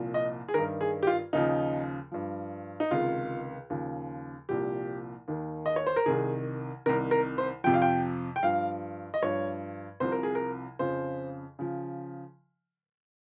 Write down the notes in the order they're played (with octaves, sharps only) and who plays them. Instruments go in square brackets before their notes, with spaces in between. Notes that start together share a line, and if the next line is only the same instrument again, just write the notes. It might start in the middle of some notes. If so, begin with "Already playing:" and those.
Already playing: [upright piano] C2 A#2 F3
D#5
G#4
G2 D#3 A#4
G#4
G4
F4
D#2 C#3 F3 D#4
G2 F3
D#4
C#2 C3 D#3 F4
D#2 C#3 F3
C2 A#2 F3 G4
D#2 D#3
D#5
C#5
C5
A#4
C2 C3 D#3 G#4
C2 C3 D#3 A#4
A#4
C5
F2 C3 F3 G5
F5
G5
G5
G2 F3 F5
D#5
G2 F3 C#5
C2 C3 F3 C5
A#4
G#4
A#4
F2 C#3 F3 C5
C#3 F3